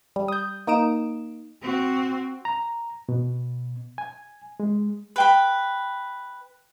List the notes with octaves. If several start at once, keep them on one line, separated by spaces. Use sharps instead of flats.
G3
D#6 G6
A#3 D#4 D#6 D7 E7
C4 F#4
A#5
B2
G#5
G#3
B4 G5 B5